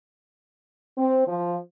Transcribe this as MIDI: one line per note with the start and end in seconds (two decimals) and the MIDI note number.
0.97 1.24 60
1.27 1.56 53